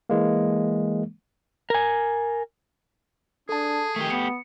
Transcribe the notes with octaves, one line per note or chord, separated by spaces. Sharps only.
E3 G#3 A#3
A#4 G#5
D4 G#4 A4 A5
D#3 A3 G4
B3 C#7